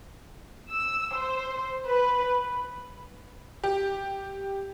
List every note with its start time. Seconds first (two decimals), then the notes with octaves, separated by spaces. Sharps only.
0.72 E6
1.17 C5
1.87 B4
3.64 G4